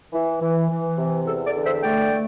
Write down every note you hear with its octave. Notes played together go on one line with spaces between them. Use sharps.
E3
E3
E3
C3
E2 A4
A4 D5
D3
C5 E5
A3 D5 G5
A3